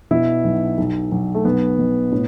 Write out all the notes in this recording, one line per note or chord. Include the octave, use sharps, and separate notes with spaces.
B2 E4
B1
B1
B1
A3
B1 B3
B2
A2